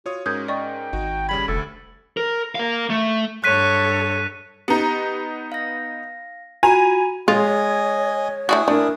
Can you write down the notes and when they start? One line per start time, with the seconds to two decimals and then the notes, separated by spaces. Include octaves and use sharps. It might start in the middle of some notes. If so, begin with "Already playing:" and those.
0.06 F4 F#4 C#5 D#6
0.26 G#2 C#4 A#4 D#6 G6 G#6
0.48 D5 D#5 G5 C#6
0.93 G#1 D#4 F#4
1.29 C#3 G3 B5 G#6
1.48 F1 D2 A4
2.17 A#4
2.55 A#4 F5
2.90 A3
3.44 G2 A4 C#5 F#6 B6 D#7
4.68 B3 D#4 G4
5.52 F5 A#6
6.63 F4 F#4 G#5 A#5 B5
7.28 G#3 F4 G#4 C#5 D#5 G#5
8.49 A3 D4 E4 F#4 G#5 D#6
8.68 A3 D4 A#4